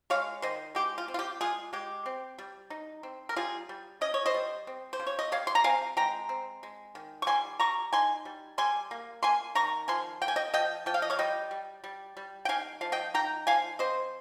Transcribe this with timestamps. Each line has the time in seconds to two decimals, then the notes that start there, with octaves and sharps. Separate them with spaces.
0.10 G#3 C#5 F5
0.42 D#3 C5 D#5
0.75 G#3 G4
0.98 F4
1.08 C4
1.14 F4
1.19 G4
1.41 G#3 F4 G#4
1.73 G#3 G4
2.06 C4
2.38 G3
2.70 D#4
3.03 C4
3.29 A#4
3.36 G3 F4 G#4
3.69 G3
4.01 C#4 D#5
4.14 C#5
4.26 C5 D#5
4.34 G3
4.67 C4
4.93 C5
5.00 C#3
5.07 C#5
5.19 D#5
5.32 G3 C#5 F5
5.47 C6
5.55 A#5
5.64 C4 F5 G#5
5.97 G#3 G5 A#5
6.29 C4
6.63 G#3
6.95 D#3
7.22 C#6
7.27 G3 G#5 C6
7.60 G3 A#5 C#6
7.93 D#4 G#5 C6
8.25 G3
8.58 G3 G#5 C6
8.91 A#3
9.23 A#3 G#5 C6
9.55 D#3 A#5 C#6
9.88 F3 G#5 C6
10.22 A#3 G5
10.28 G#5
10.36 D#5 G5
10.53 F3 D#5 G5
10.86 F3 G5
10.94 F5
11.02 D#5
11.10 C#5 F5
11.19 G3 D#5 G5
11.51 G3
11.84 G3
12.17 G3
12.45 G5
12.49 D#4 F5 G#5
12.81 F3 F5
12.92 D#5 G5
13.14 D#4 G5 A#5
13.47 F3 F5 G#5
13.79 C4 C5 D#5